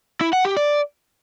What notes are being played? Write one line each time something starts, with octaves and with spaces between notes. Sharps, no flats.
E4
F#5
G4
D5